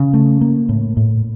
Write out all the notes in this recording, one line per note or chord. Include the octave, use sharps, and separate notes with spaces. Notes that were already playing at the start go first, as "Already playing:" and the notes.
Already playing: C#3
A3
A#3
A2
A2